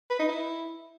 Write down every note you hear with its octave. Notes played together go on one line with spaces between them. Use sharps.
B4
D#4
E4